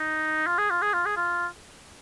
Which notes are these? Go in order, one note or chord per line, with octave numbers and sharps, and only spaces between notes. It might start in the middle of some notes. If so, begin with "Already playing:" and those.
Already playing: D#4
F4
G#4
F4
G#4
F4
G#4
F4